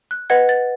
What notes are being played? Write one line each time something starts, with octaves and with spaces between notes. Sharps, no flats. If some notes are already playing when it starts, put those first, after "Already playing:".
F#6
B4 D#5 F#5 G#6
A6